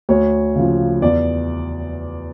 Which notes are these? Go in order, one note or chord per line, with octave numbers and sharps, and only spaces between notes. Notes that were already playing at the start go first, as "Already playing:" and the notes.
D2 C#5
C#3 F3
E2 D5